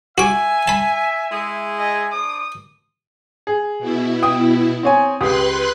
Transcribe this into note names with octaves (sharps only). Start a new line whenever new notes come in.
F#4 E5 G#5 D6
A5 B5
G#3 E4 G#4
D#5 E5 G#5
D4 C5 D6 D#6
G#4
B2 E4
G5 D#6
C4 C#5 G#5
C#2 G4 B4 C6 D#6 F#6